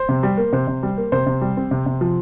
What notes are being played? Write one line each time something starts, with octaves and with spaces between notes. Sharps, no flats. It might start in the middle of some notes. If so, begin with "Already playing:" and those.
Already playing: C5
C3
G3
A#3
C3 C5
C3
G3
A#3
C3 C5
C3
G3
C4
C3
C3
F3